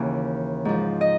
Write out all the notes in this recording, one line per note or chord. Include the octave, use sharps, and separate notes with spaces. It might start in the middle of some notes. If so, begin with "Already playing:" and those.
Already playing: D#2 C#3 E3
G#2 F3
D#5